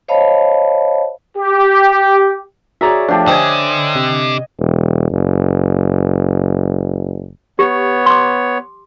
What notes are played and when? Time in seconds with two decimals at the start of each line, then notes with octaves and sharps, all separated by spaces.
0.08 C5 C#5 D#5 F5 A5 B5
1.38 G4
2.81 F#4 G#4 C#5 D5 E5 A#5
3.08 F3 A3 D4 G4
3.27 D3 C5 D#5 G5 G#5
3.95 C3
4.59 E1
5.12 F#1
7.59 B3 G4 C#5
8.06 C6 D6